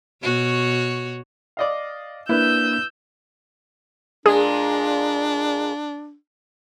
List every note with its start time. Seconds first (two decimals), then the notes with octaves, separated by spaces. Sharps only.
0.22 B2 F#4 C#5
1.57 D5 D#5 F5
2.29 A#3 D4 E4 B4 E6 G6
4.26 A#2 G#3 D4 G#4